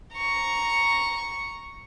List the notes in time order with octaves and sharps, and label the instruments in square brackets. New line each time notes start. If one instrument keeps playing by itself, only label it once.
[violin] A#5 C#6